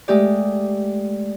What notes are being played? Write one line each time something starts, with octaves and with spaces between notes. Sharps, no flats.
G#3 A3 G4 D5